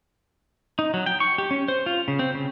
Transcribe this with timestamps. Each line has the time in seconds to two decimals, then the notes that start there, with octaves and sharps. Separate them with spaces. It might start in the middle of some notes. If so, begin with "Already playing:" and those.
0.79 D#4
0.94 F#3
1.06 G5
1.20 C#6
1.38 G4
1.51 C#4
1.68 C5
1.86 F4
2.08 C#3
2.19 C4
2.35 C#3